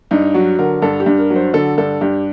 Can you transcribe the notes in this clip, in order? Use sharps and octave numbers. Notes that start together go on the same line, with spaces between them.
G2 D#4
F#3 F#4
D3 A#4
G2 A4
G4
G2
A#4
F#3
C5
D3 A4
G2 A4
G2 G4